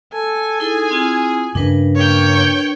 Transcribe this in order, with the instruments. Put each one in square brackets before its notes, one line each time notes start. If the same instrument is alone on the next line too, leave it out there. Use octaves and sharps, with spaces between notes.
[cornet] A4 [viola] G#5
[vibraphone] D#4 E4 A4 [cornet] G#4
[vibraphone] C4 E4 F4
[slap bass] G2 C#3 [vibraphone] D4 A#4 B4
[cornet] A#3 [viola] C#5 G5